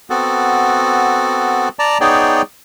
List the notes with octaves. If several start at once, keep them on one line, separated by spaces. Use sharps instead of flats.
B3 C4 F#4 A4
D5 A5 A#5
B3 D#4 G#4 C#5 D5 G5